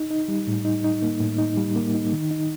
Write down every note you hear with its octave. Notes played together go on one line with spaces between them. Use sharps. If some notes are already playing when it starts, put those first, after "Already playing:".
Already playing: D#4
D#4
G3
A2
D#4
D#4
A#3
A2
D#4
G3
A#3
D#4
D#3
D#4